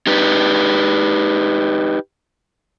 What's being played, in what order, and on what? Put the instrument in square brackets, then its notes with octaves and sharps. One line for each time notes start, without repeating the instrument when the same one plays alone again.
[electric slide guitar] D#4 G4 B4